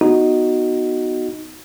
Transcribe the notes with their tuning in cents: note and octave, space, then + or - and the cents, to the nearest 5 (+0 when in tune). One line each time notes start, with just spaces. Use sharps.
B3 +0 D#4 +0 F#4 +0